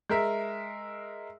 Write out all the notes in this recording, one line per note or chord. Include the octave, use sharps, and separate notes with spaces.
G#3 A#4 E5